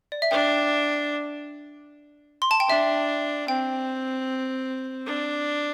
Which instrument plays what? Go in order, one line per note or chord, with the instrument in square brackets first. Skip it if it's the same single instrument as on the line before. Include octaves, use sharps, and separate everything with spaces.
[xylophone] D5
E5
[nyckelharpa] D4 [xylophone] G5
[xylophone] C6
A5
G5
[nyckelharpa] D4 [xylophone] E5
[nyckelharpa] C4 [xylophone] G5
[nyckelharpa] D4